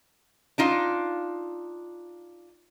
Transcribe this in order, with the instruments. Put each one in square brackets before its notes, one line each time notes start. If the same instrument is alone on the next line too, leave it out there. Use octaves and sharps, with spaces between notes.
[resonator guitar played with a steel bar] D4 D#4 F4